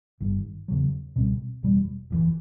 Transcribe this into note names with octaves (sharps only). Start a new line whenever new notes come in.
G1 G2 D#3
E2 C#3 F#3
C#2 B2 G3 C4
F1 E2 B2 G3
F#1 F2 C3 E3